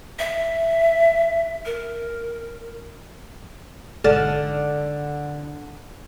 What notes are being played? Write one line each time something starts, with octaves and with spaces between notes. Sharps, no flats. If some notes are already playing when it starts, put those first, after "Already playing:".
E5
A#4
G#1 D3 A4 F6